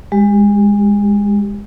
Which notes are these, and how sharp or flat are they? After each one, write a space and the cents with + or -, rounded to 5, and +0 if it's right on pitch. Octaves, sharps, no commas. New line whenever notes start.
G#3 -25 G4 +0